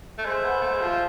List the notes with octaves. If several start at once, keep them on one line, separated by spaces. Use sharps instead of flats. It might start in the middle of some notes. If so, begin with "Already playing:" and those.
A3
G#3 C5 E5
B3
A3
G#3
F3